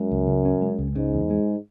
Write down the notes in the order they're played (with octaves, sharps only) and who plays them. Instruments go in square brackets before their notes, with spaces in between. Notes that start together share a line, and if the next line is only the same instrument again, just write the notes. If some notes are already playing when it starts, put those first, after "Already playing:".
Already playing: [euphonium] F#2 [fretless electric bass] G#3
[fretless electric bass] C#2
C#3
C#4
G#3
C#2
[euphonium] G#2 [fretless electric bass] C#3
[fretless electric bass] E2
G#3